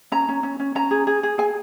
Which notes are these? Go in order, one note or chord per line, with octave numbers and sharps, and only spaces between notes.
C#4 A#5
C#4
C#4
C#4
C#4 A#5
G#4
G#4
G#4
G#4 G#5